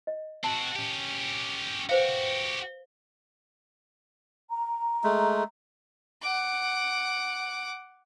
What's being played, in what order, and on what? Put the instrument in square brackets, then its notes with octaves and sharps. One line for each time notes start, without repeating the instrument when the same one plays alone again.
[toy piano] D#5
[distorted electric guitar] C4 F#4 [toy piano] A5
[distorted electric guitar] C#4 G4
[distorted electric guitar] F#4 G4 [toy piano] B4 C5 F5
[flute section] A#5
[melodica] G#3 A3
[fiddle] F#5 D6